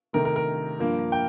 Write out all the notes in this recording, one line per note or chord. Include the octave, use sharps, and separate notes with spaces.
C3 D#3 A3 A#4
A#4
A#4
G2 F3 A#3
G5